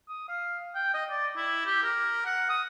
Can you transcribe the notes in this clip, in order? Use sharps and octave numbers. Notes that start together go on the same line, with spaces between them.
D#6
F5
G5
D#5
D5
E4
G4
A#4
F#5
D#6